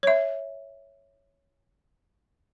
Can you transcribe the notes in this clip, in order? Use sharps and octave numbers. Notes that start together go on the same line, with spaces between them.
C#5 E5